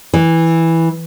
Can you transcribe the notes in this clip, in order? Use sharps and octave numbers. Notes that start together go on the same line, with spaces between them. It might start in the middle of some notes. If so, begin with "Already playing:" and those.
E3